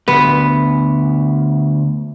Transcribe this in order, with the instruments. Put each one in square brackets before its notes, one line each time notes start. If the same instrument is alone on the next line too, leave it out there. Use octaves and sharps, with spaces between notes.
[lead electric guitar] D2 [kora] B3